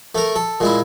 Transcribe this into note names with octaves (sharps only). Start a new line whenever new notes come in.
A3 A#4
A4
A#2 G#3 E4